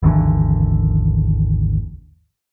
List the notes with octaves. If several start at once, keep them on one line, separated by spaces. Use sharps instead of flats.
G#1 D#2 D3 E3